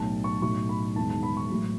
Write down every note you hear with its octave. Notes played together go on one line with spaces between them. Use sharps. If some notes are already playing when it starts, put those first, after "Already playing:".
Already playing: B1 A2 F#3 A5
C#6
B1 A2 F#3 C#6
B5
E1 E2 D#3 A5
A5
B5
C#6
A1 A2 F#3